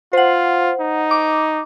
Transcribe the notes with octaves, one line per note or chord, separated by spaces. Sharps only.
F4 C5 F#5
D#4
D6